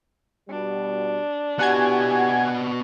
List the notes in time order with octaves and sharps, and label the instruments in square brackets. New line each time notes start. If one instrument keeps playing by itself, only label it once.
[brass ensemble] B2 G3 [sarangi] D4
[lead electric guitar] B3 F#4 [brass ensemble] E4 G4 [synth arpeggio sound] F#5 G#5 G#6